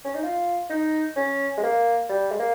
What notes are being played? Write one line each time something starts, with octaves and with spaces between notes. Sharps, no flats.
C#4
D#4
F4
D#4
C#4
G#3
A#3
G3
G#3
A#3